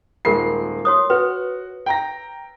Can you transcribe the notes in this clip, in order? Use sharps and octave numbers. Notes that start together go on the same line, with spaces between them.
D#1 G#3 F4 A#4 C7
F#4 C#5 D#6
F#4 B4
G5 A#5 A#6